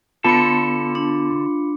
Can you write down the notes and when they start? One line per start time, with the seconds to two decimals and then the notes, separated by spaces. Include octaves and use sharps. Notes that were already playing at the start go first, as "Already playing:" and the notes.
0.24 D3 B3 F4 A4 A5 B5 C#7
0.95 D4